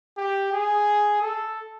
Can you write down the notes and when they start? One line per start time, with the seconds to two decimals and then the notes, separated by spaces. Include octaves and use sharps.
0.17 G4
0.53 G#4
1.21 A4